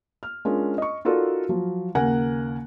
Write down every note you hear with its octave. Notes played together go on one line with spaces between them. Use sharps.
F6
G#3 C#4 D4 F4 A#4
D#5 C#6
D#4 F4 F#4 A4 A#4 D5
F3 F#3
D#2 C#3 A#4 F#5 G#5 F#6